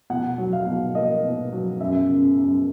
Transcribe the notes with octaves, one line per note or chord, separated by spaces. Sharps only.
B2 F#5
F#3
F5
B2
A#3 D#5
B2
F#3
F#2 E5
C#3
F#2